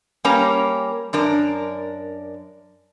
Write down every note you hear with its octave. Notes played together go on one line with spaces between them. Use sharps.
G3 A#3 C#4 A#4 A#5
F#2 D4 A#4